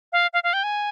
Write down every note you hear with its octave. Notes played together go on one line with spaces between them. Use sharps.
F5
F5
F5
G5
G#5